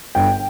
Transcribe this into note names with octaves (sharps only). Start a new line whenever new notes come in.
G1 G5